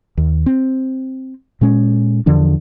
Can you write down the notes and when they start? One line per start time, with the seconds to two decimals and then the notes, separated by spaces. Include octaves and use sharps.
0.18 D#2
0.46 C4
1.61 A#2 G#3 C#4
2.26 E2 D3 F3 D4